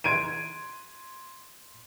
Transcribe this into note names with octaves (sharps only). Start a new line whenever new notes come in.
C6 G#6 D7 D#7